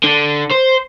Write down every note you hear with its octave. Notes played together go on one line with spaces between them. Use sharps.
D3
C5